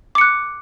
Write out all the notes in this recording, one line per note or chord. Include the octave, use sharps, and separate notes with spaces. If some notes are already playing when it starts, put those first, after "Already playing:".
D6 F#6 C#7